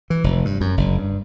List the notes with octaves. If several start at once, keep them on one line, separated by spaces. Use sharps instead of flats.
E3
F1
G2
F#2
F#1
G2